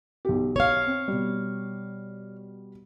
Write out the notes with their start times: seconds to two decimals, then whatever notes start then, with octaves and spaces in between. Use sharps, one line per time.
0.25 B1 G4
0.56 C#5 F5
0.86 C4
1.08 B2 G3